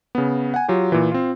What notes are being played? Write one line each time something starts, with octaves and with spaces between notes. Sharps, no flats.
C#3 B3
F#5 G#5
F#3 F4 G4
A#2 E3
C4 F4